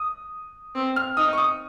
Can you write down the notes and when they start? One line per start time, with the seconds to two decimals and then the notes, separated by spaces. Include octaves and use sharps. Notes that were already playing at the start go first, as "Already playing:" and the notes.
Already playing: D#6
0.75 C4
0.96 F6
1.17 D#4 D#6
1.33 C#6
1.38 D#6